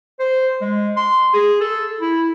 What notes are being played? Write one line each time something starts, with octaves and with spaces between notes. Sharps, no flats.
C5
G#3
C6
G#4
A4
E4